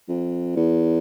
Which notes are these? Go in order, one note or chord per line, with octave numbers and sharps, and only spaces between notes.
F2
E2